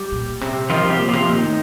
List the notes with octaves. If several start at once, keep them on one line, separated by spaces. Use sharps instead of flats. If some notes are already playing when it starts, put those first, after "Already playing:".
Already playing: G3 G4
A#2
C3
D#3 F3 F4
C3 G3 G4
A#2
C3 F3 F4
A#2 D#3 D#4
A2